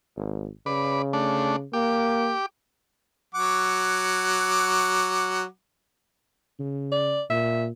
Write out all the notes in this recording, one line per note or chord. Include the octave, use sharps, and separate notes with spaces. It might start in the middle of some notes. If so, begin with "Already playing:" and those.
G#1
C#3 B4 D5
A3 D4
A#3 G4 D6
F#3 F#5 D6
C#3
D5
A#2 E5